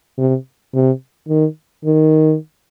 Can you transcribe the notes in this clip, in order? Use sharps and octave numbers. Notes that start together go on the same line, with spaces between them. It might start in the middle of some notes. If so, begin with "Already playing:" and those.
C3
C3
D#3
D#3